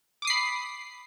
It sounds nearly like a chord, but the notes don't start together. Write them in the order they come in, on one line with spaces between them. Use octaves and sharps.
D6 D#6 C7 B5